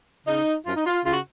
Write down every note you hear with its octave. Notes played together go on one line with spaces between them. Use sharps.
C#3 D#4
F#2 F4
D#4
F4
C#3 F4
F#4